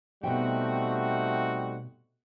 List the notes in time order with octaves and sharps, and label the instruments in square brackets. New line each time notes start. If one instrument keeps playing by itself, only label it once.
[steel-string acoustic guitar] B2 E5 G5 [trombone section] G3 A3 [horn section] C4 D#4 F#4